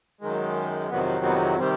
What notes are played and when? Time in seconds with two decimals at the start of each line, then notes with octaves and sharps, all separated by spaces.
0.21 F#2 D#3 G#3
0.90 F2 C3 D#3 F#3 B3
1.25 B3
1.59 C3 D#3 G3 C4